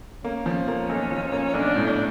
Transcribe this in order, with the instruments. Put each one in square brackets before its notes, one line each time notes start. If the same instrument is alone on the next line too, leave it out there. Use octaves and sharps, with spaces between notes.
[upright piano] A#3 [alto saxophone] C#4
[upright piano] F3
A#3
B1
F3
A#3
[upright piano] B1 [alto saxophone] D4
[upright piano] A2
[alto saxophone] D4